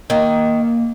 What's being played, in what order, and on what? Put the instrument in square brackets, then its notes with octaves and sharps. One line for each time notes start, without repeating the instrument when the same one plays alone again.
[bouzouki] D#3 [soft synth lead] A#3